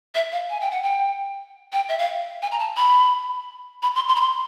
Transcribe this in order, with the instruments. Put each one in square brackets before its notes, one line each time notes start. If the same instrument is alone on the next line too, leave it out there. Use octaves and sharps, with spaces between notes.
[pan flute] E5
F5
G#5
G5
F#5
G5
G5
E5
F5
G#5
A#5
A5
B5
B5
C6
C6
B5
C6